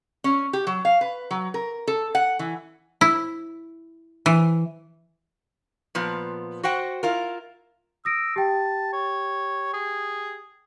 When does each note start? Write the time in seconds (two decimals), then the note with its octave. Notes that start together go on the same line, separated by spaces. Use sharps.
0.24 C#4
0.53 G4
0.67 F#3
0.85 F5
1.01 B4
1.31 F#3
1.54 A#4
1.87 A4
2.15 F#5
2.39 E3
3.01 E4
4.26 E3
5.95 A#2 F3 B3
6.63 F#4 C5 F#5 G5
7.03 E4 F4 A#4
8.05 D#6 E6 A#6 D7
8.36 G4 G5 A5
8.93 C#5
9.73 G#4